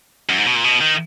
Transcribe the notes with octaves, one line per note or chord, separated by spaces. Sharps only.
F#2
G#2
B2
A#2
B2
D#3